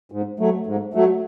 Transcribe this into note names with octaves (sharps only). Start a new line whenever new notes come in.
G#2
F#3 A3
G#2
F#3 A3